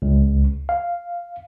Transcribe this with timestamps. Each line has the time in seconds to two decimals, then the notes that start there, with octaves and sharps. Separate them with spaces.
0.02 C#2
0.69 F5